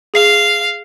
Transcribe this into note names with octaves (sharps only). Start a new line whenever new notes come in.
G#4 F5 C7 F7